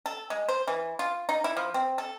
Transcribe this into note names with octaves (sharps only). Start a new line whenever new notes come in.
A4
G#3
C5
E3
F4
D#4
E4
F3
C4
A4